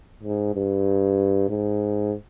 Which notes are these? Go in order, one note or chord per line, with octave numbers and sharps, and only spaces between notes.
G#2
G2
G#2